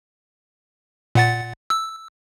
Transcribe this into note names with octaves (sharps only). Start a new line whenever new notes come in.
A#2 F#5 A6
E6